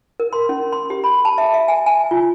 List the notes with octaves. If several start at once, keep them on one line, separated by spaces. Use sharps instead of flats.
A#4
C6
C#4
C6
G4
B5
A5
E5
E5
G#5
G#5
F4